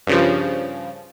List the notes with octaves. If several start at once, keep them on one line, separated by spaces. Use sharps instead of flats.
G2 C#3 F3